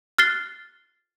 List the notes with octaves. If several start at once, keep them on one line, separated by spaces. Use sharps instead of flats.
F6 F#6 A6 C7 G7